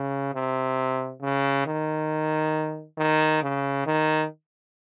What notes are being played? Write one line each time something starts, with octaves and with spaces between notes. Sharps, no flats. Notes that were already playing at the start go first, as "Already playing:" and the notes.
Already playing: C#3
C3
C#3
D#3
D#3
C#3
D#3